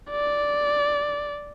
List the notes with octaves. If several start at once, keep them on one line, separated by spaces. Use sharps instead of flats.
D5